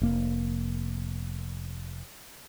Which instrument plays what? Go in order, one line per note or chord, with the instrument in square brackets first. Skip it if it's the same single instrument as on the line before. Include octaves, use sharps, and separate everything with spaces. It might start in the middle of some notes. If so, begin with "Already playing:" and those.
[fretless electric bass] F1 A#3